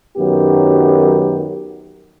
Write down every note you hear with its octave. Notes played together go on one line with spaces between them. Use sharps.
F#2 D#3 F#3 B3 G4